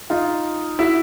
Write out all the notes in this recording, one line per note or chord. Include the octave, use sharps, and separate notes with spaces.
D#4 F4
E4 F#4